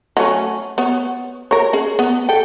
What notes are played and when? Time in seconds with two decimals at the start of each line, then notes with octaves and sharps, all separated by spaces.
0.17 F#3 A3 C#4
0.78 B3 C#5
1.51 A#4 C#5
1.73 C#4 G#4
1.99 B3
2.29 A4 G5